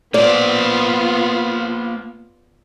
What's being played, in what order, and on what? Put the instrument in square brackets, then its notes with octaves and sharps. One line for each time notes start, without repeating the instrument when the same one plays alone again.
[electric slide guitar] A#3 C5 [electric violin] B3 F4 [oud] D5